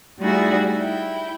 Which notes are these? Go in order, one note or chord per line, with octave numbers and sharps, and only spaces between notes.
G3 A3 D#4 E4 F#4 G#4
E4 G5